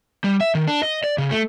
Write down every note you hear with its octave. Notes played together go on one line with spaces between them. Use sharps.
G3
E5
D#3
D4
D#5
D5
C#3
A3